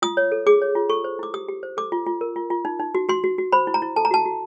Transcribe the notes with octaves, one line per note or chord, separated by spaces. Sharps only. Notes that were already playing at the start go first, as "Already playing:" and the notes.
F4 D#6
C#5
A4
G#4 D6
C#5
F4
A4 C#6
C5
E4 D6
G4 D#6
G4
C5
A4 D6
F4
F4
A#4
F4
F4
D#4
D#4
F#4
F#4 C6
F#4
F#4
C5 B5
E4
A#5
E4
A4 A5
A#5
F#4 A5
F#4